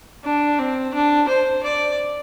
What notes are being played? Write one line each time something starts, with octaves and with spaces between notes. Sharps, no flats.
D4
C4
D4
C5
D5